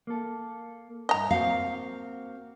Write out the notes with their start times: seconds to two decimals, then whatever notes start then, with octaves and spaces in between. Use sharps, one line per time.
0.07 A#3 A4
1.09 G2 E4 D#5 A#5
1.31 A#3 C4 F#4 F5